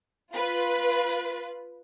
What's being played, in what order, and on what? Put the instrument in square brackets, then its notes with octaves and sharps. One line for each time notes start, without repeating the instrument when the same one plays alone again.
[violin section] F4 B4